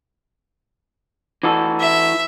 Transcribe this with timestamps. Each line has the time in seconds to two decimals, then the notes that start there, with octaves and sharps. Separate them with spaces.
1.43 E3 F#4 A4
1.80 E5